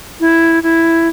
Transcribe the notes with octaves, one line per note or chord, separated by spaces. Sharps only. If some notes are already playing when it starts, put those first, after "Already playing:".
E4
E4